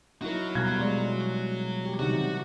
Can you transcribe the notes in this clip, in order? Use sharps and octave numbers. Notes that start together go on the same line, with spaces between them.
F#3 D#4 E4 F#4 A#4
B2 G3 F5 A#5 F#6 G#6
G3 G#3 D5 C6
G4
C3 D#3 F#3 D4 F#4 D5